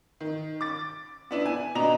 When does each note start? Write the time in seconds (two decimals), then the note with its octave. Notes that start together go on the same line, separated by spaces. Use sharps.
0.21 D#3
0.61 D6 A6
1.31 B3 D4 E4
1.46 G#5
1.75 B2 D4 D#5 A#5 F7